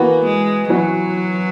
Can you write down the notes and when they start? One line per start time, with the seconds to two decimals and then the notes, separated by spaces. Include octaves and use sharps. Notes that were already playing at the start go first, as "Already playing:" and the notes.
Already playing: E3 A#3 B3 F#4 B4
0.25 G#3
0.70 E3 F#3 B3 F#4 B4